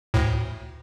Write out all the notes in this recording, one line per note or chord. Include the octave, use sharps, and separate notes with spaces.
D2 A2